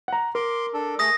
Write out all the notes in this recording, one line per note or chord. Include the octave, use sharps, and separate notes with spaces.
F#5 A#5
A#4 C6 D6
D4 A4
A3 G#4 D#6 A#6